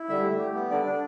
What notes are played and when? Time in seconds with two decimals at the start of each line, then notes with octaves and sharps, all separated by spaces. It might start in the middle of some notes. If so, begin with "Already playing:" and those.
Already playing: E4
0.09 D3 G3 E5
0.24 A3
0.39 G4
0.55 B3
0.70 D3 G3 D5
0.85 D4